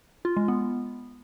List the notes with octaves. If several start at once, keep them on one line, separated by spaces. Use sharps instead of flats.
F4
G#3
B3